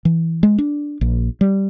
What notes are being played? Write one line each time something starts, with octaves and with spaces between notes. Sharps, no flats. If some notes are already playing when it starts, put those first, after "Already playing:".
E3
G#3
D4
A#1
G3